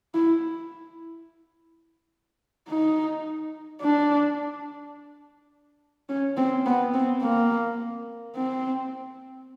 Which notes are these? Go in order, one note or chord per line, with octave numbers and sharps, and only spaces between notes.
E4
D#4
D4
C#4
C4
B3
C4
A#3
C4